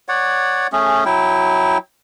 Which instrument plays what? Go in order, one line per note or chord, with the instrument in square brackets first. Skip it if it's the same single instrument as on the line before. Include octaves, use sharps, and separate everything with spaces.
[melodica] C#5 D5 F#5
A3 C#4 G#4
F#3 E4 G5